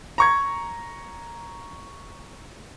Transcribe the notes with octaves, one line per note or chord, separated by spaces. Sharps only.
A#5 C#6 G#6